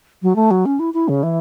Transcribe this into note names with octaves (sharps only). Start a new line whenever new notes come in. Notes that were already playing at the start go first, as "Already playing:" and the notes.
F#3
A3
F#3
C#4
E4
E4
C#3
E3